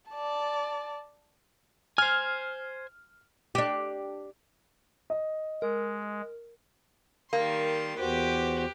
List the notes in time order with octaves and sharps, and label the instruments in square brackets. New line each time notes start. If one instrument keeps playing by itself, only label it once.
[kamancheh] D5 A5
[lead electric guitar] C5 G#5 [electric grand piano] F6
[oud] D4 G4
[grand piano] D#5
[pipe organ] G#3 [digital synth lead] A#4
[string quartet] D#3 G3 C6 [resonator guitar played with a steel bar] A#3
[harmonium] E2 F#4 C5 [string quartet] G4 B4 D6